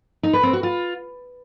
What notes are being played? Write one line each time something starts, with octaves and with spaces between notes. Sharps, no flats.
D#4
B4
C4
F#4
F4